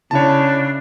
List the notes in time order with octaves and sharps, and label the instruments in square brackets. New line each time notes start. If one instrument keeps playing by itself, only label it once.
[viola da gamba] C#3 [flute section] D4 E4 [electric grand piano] C#5 A5